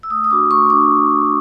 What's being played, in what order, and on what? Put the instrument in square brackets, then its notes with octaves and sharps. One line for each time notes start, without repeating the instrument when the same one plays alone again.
[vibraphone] E6
A3 D#6
D#6
D4 F#4 D6
A3 C#6
D4 F#4 D6